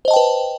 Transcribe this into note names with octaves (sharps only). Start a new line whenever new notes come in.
B4 C5 D#5 G5 A5